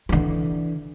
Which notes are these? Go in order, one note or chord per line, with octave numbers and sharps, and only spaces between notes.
D3 E3